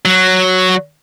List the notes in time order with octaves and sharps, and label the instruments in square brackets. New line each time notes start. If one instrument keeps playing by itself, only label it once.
[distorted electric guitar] F#3